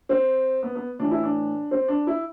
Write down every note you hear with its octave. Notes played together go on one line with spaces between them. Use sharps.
C4
B3
B3
A2 E3 D4
E4
D4
C4
D4
E4